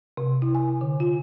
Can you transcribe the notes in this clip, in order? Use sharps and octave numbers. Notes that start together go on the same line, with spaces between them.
C3
E4
G#5
D3
F4